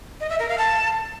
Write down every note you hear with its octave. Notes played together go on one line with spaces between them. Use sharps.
D#5
E5
A#4
F5
A5